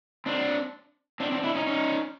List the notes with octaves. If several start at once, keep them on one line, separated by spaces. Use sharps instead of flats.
C4 D4
C4 D4
C4 D4
D4 E4
C#4 D#4
C#4 D#4